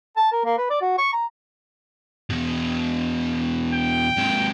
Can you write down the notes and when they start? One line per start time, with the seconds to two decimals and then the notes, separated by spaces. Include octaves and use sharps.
0.17 A5
0.32 A#4
0.44 A#3
0.57 B4
0.70 D5
0.82 F#4
0.98 C#6
1.13 A#5
2.30 E2 B2
3.73 G5
4.17 G#2 C3